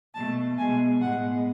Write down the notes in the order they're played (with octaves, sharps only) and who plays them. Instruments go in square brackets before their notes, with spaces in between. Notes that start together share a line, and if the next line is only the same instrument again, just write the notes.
[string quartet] B2 A3 A5
B2 G#3 B3 G#5
A2 G#3 B3 F#5